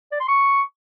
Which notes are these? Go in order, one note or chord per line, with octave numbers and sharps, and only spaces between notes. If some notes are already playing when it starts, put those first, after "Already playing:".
D5
C6
C#6